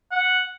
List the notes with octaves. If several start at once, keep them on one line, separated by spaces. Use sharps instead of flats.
F#5